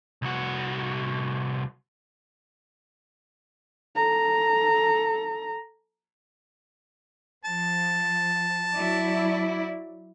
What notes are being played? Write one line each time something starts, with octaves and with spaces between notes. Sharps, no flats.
C2 F#4
A4 A#5
F3 A5
F#3 E4 D5